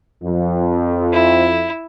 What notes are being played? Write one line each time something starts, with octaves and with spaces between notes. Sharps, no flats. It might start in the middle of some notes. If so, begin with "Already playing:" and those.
F2
E4